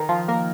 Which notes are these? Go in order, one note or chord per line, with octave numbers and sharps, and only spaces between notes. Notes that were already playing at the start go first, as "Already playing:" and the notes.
Already playing: D#3 D#4
F3 F4
A#3 A#4